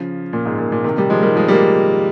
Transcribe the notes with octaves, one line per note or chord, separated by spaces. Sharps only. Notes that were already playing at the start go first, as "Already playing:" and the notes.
Already playing: C#3 F3
A#2
G#2
A#2
A#2
C3 D#3
D#3 G3
F3 G#3
D#3 G3
F3 G#3
G3 A#3